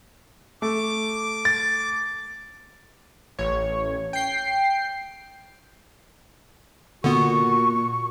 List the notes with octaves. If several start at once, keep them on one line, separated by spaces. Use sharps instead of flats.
A3 D6
A6
A1 C#5
G5 C7
A#2 D3 B3 F#4 C#6